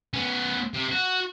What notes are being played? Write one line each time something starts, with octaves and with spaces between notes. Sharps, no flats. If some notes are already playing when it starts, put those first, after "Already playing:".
B3 C#4
C3
F#4